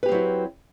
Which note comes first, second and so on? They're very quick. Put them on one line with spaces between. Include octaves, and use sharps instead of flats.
B4 G4 C4 F#3 E4